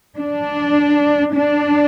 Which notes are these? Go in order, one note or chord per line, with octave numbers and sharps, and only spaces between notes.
D4
D4